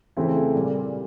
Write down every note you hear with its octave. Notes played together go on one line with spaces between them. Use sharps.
C#3 E3 A3 C4 E4
A#2 G3 A#3